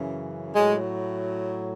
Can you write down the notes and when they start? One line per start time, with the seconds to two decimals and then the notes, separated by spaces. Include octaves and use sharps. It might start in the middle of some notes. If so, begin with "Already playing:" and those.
Already playing: F#2 C#3 E3
0.55 A2 F#3 G#3